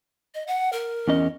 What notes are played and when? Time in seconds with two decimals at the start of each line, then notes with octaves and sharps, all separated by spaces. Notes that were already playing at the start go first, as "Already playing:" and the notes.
0.35 D#5
0.47 F#5
0.73 A#4
1.08 E2 C#4 D#5